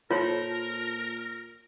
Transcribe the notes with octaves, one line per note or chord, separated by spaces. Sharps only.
A#2 F4 A4 A#4 C5 C#5